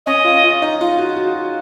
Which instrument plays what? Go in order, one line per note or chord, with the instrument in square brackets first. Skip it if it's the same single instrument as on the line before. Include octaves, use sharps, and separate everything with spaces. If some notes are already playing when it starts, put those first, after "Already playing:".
[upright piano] C#4 [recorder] D#5
[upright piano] F4
F4
D#4
F4
F#4
F#4